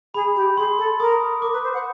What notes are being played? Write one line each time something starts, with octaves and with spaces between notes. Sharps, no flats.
G#4 B5
G4
G#4 C6
A4
A#4 D#6
A#4 D6
B4
C5
F#5